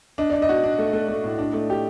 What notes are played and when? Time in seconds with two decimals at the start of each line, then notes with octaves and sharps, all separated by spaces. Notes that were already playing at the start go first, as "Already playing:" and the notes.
0.18 D4 D#5
0.30 D4 D5
0.42 D#5
0.49 F#4
0.64 D4
0.78 A3
0.93 A3
1.08 A3
1.24 A2
1.39 D4
1.53 A3
1.70 G4